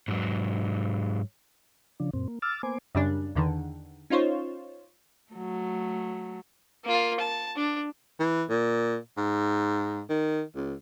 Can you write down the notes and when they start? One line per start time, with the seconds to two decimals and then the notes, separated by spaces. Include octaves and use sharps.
0.08 G#2 F#3
2.00 C#3 F3 D4
2.13 F#2 A#2 C4
2.28 A#3
2.42 D6 E6 F6 A6
2.63 A#3 B3 C5 G#5 D6
2.95 F#2 C#3 G3 D4
3.35 E2 D3 D#3
4.10 C#4 D#4 F4 C5 C#5
5.33 F#3 A3
6.84 A#3 F4
7.19 A5
7.56 D4
8.19 E3
8.49 A#2
9.17 G#2
10.09 D#3
10.56 C#2